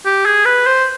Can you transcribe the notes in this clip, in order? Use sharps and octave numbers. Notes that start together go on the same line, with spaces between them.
G4
G#4
B4
C5